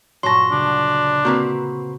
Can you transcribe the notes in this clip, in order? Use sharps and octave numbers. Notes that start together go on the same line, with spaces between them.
G2 A#2 F#3 A5 C6 A#6
D2 C#3 D4
A#3 C4 F#4 B4 C#6 E6